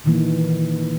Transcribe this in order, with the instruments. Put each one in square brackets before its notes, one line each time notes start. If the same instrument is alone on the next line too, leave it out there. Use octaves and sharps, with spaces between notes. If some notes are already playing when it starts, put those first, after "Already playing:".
[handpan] A#2 D#3 E3 A#3